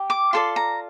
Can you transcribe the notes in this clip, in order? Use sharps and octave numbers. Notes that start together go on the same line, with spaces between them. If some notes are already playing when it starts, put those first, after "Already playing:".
Already playing: G4
D6
F4 A4 D5 C6
A#5